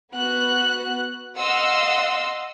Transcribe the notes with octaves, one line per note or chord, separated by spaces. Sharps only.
B3 F#4 F#6
D#5 F5 F#5 C6 D#6 E6